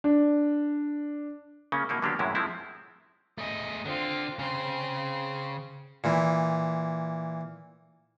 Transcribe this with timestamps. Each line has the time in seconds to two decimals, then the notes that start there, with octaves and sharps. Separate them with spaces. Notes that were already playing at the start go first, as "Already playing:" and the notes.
0.04 D4
1.72 C#3 A#3 C#4
1.89 B2 A#3 D#4 E4
2.02 D3 F#3 A#3 B3 D4 G4
2.19 F#2 A2 C3 E3 G#3 E4
2.35 F3 G#3 A3 C4 E4
3.38 A3 G#4 D#5
3.85 D3 C4 F4
4.39 C#3 C4 G#4 C6
6.04 A#2 E3